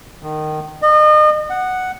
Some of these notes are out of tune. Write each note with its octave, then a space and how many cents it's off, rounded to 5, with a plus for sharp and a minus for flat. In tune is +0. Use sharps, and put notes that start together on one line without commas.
D#3 -20
D#5 -35
F#5 +0